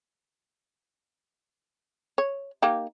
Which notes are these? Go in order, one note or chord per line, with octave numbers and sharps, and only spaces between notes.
C#5
A#3 D#4 G4